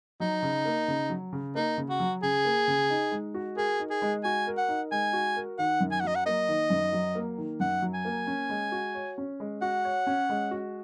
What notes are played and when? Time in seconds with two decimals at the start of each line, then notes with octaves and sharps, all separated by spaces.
0.20 F#3 D#4
0.42 C#3
0.65 A#3
0.88 C#3
1.10 F#3
1.33 C#3
1.55 A#3 D#4
1.78 C#3
1.89 F#4
2.00 F#3
2.23 C#3 G#4
2.45 A#3
2.68 C#3
2.90 D#4
3.12 G#3
3.34 F#4
3.56 G#4 A#4
3.80 D#4
3.90 G#4
4.02 G#3
4.24 F#4 G#5
4.47 A#4
4.58 F#5
4.68 D#4
4.92 G#3 G#5
5.13 F#4
5.36 A#4
5.58 D#3 F#5
5.80 F#2
5.92 G#5
6.00 F#5
6.04 F#3 D#5
6.16 F#5
6.26 A#3 D#5
6.48 D#3
6.70 F#2
6.93 F#3
7.15 A#3
7.38 D#3
7.60 F#2 F#5
7.82 F#3
7.94 G#5
8.05 A#3
8.27 C#4
8.49 G#3
8.72 F#4
8.95 C#5
9.18 C#4
9.40 G#3
9.62 F#4 F#5
9.85 C#5
10.07 C#4
10.29 G#3
10.51 F#4